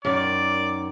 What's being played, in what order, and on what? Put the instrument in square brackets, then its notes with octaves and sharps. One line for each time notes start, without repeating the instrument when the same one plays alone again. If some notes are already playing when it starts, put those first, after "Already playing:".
[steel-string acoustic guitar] F#2 D#3 [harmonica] D5